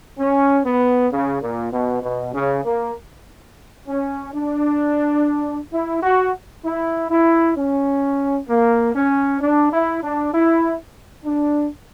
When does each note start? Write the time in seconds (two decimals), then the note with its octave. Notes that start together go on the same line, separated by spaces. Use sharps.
0.18 C#4
0.65 B3
1.11 C#3
1.42 A#2
1.72 B2
2.03 B2
2.34 C#3
2.65 A#3
3.88 C#4
4.34 D4
5.72 E4
6.03 F#4
6.65 E4
7.11 E4
7.56 C#4
8.48 A#3
8.94 C#4
9.41 D4
9.72 E4
10.02 D4
10.33 E4
11.25 D4